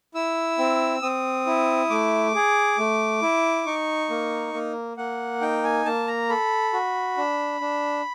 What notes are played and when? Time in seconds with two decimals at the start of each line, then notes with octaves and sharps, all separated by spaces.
0.14 E4 E6
0.58 C4
1.02 C4 D#6
1.46 E4
1.90 A3 D6
2.35 G#4
2.78 A3
3.22 E4
3.66 D#4 C#6
4.10 A#3
4.54 A#3
4.97 A#3 F#5
5.41 D#4 G5
5.64 G#5
5.85 A#3 A5
6.07 A#5
6.29 A4 B5
6.73 F#4
7.17 D4
7.61 D4